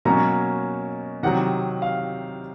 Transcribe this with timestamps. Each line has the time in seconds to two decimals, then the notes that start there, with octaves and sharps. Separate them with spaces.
0.05 B2 F#3 A#3 C#4 A#5
1.23 C3 D#3 F#3 F#5
1.82 F5